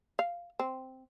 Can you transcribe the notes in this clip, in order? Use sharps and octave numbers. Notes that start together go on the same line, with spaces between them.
F5
C4